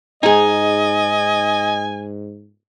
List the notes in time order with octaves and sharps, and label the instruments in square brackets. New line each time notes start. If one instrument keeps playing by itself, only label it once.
[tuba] G#2 [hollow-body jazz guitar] D#4 G#4 [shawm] D#5 [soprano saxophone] G#5